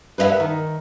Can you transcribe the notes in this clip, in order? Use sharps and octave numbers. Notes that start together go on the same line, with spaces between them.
B4 C5 D#5 E5 F#5
D#3